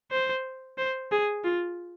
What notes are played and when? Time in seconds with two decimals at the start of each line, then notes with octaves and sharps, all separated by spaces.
0.11 C5
0.78 C5
1.12 G#4
1.45 F4